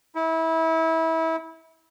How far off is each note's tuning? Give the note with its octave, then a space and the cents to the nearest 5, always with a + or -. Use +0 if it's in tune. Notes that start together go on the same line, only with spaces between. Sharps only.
E4 -25